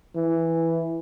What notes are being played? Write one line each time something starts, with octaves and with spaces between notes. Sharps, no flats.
E3